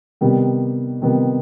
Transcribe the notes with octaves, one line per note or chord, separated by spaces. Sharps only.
C3 D#3 G3 B3
C3 D#3 G3 B3